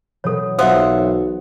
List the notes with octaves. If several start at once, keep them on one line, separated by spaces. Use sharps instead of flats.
B2 E3 F#3 A4 C#5
B1 F4 F#4 C5 E5 F#5 D#6 C#7